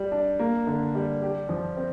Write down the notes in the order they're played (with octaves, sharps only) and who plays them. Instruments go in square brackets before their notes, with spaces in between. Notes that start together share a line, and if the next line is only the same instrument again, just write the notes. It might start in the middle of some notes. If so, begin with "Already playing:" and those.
Already playing: [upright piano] G3
D4
A#3
D3
G3
G4
F3
C4